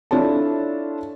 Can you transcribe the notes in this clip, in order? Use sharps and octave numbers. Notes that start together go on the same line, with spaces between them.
D4 E4 F4 A4 C#5 A5